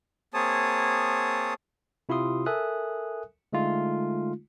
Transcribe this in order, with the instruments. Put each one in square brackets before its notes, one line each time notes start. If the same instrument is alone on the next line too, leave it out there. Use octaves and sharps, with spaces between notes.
[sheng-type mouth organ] A#3 C4 G#4 C#5 A5 D#6
[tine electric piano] C3 E4 F4 G4 C6 D#6
A4 A#4 E5 G#5 D#6 F#6
D3 G#3 A3 D#4 F4